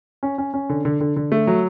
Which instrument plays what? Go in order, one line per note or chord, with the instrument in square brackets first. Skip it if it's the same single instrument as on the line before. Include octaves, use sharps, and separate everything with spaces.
[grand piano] C#4
C#4
C#4
D3
D3
D3
D3
A3
F#3